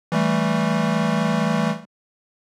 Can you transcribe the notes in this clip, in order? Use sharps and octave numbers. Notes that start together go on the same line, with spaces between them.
E3 G3 A3